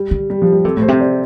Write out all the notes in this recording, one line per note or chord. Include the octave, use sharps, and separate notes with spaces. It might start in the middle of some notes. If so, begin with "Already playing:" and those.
Already playing: G3
D3
G3
F3
G3
C3 A4
A2
C5
C3
D5